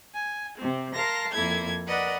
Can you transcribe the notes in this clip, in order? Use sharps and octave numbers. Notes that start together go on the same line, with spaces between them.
G#5
C3 C4
A#4 F5 A5 C6 A#6
F2 A#3 E4 A4 G#6
A#4 B4 D5 D#5 F#5